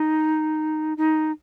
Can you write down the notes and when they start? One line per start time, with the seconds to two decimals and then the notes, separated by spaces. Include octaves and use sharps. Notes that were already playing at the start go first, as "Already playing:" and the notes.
Already playing: D#4
0.97 D#4